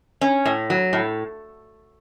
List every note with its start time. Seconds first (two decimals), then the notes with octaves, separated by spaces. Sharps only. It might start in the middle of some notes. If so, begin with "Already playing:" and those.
0.21 C#4
0.46 A2
0.70 F#3
0.93 A2